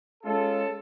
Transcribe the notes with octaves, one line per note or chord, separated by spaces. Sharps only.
G#3 C#4 F4 A4